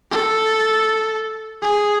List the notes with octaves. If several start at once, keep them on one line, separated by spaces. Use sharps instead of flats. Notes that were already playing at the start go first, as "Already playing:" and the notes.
A4
G#4